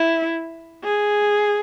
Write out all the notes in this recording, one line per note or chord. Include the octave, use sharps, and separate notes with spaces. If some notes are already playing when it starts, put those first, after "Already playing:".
Already playing: E4
G#4